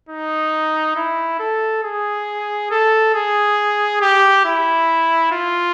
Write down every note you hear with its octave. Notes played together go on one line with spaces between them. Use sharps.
D#4
E4
A4
G#4
A4
G#4
G4
E4
F4